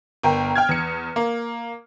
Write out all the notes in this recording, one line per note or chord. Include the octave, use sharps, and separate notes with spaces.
G1 A#4 G5
G5 F6 G#6
E2 C#7
A#3